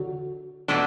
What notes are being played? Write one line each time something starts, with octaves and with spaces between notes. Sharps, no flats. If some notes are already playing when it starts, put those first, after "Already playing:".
Already playing: D3 F#3
B2 A3 D4